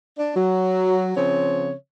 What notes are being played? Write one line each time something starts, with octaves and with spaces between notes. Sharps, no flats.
D4
F#3
C#3 F3 C4 C#5